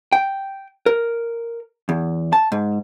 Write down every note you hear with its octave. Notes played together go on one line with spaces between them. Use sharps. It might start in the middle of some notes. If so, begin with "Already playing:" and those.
G5
A#4
E2
A5
G#2